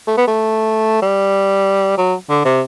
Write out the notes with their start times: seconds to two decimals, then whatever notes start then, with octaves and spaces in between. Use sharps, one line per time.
0.07 A3
0.17 B3
0.27 A3
1.02 G3
1.98 F#3
2.29 D3
2.45 C3